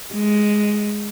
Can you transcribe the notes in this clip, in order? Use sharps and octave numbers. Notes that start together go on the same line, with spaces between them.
G#3